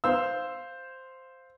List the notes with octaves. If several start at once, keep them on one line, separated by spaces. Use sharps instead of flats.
C5 F5 E6